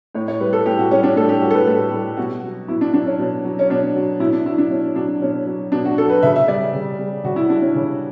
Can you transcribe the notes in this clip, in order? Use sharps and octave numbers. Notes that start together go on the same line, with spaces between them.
A2 C#5
C#5
G3 B4
A4
A2 G4
F#4
G3 C#4
D4
A2 A4
G4
G3 F#4
A4
B4
A2 A4
G3
B2 F#4
F#3
B2 E4
D4
F#3 D4
C#4
B2
F#3
C#4
B2 D4
F#3
B2 E4
D4
F#3 E4
D4
B2 C#4
F#3 D4
B2 C#4
F#3
B2 D4
F#4
F#3 A4
B4
C#3 E5
E5
G3 D5
C#3
G3
C#3 F#4
E4
G3 D4
C#4
C#3